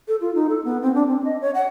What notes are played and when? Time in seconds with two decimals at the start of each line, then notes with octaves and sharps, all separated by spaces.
0.08 A4
0.21 F4
0.35 D#4
0.49 A4
0.65 B3
0.82 C4
0.95 D4
1.07 C4
1.25 D#5
1.41 C#5
1.55 F#5